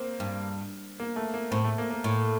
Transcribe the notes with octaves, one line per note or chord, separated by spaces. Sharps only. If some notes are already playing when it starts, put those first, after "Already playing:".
Already playing: A#3 C4
G2
A#3
A3
A#3
A2 C4
A3
A#3
A#3
A2